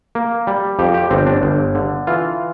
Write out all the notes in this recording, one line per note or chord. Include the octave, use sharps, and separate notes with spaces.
A#3
G3
F2 G4
G4
G1 C4
D4
G1
D3
E3 F4